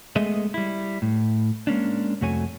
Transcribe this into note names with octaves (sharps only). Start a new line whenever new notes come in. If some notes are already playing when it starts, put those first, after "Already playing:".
G#3 A3 B3 G#4 D#5 E5
G3 E4
A2
G#3 A#3 C#4 D4
C2 F2 A3 F#4 C#5 G#5